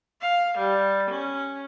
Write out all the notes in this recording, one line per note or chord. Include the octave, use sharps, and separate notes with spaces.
F5
G3
C#4